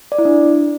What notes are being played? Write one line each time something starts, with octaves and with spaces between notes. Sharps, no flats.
D5
E4
D4